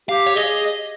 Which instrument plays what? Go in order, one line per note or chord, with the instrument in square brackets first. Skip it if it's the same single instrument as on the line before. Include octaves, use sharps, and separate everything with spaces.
[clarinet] G4 [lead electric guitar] F5
[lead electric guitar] C#5
[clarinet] G#4 [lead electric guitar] D#5